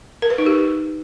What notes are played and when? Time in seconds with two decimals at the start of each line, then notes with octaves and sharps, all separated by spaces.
0.22 A#4
0.30 B4
0.38 D#4
0.46 G4